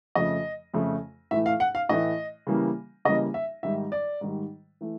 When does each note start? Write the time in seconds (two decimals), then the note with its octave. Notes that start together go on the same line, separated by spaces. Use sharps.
0.15 F2 C#3 F3 A3 D#5
0.74 F2 C#3 F3 A3
1.31 A2 E3 A3 E5
1.46 F5
1.60 F#5
1.75 F5
1.89 A2 E3 A3 D#5
2.47 C#3 E3 G3 A#3
3.05 C#3 E3 G3 A#3 D#5
3.34 E5
3.63 G#2 D#3 G3 E5
3.92 D5
4.21 G#2 D#3 G3
4.81 E3 A3